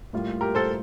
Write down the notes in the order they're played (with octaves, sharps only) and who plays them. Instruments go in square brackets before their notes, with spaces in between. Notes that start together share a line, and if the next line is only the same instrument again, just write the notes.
[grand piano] A2 G3 A#3 F4
[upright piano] G4 A#4
A4 C5